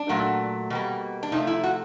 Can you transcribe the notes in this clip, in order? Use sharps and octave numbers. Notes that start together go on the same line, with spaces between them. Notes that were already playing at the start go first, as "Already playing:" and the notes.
Already playing: D4
A#2 F#3 A3
B2 G3 A#3
D4
C3 F3 A3 D#4
E4
F#4